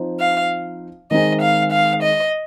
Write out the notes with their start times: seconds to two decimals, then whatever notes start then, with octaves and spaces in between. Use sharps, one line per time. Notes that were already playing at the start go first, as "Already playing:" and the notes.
Already playing: F3 C4 D#4
0.19 F5
1.11 D#3 G#3 C4 D#4 G#4 D#5
1.41 F5
1.72 F5
2.02 D#5